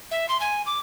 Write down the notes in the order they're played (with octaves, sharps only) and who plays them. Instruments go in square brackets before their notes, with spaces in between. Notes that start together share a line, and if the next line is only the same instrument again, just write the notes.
[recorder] E5
C6
G#5
D6